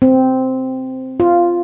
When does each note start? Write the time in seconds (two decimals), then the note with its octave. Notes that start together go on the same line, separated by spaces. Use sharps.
0.02 C4
1.20 F4